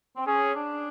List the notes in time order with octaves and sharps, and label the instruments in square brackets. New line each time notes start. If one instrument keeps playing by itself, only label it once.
[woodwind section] C4
[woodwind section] C#4 [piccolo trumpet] G#4
[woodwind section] D4